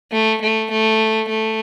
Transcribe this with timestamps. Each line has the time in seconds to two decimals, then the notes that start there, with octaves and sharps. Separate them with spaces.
0.12 A3
0.41 A3
0.71 A3
1.29 A3